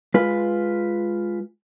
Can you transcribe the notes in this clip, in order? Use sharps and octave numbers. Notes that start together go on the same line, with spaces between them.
G#3 F4 B4